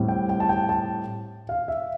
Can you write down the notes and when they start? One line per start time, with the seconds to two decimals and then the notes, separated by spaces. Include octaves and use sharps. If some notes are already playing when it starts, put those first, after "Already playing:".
Already playing: A2 G3 C4
0.08 G5
0.29 G5
0.40 A5
0.49 G5
0.69 A5
1.49 F5
1.68 E5